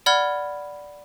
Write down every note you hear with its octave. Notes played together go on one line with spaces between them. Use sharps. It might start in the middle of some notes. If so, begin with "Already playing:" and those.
D5 F#5 B5 F6 G#6 G7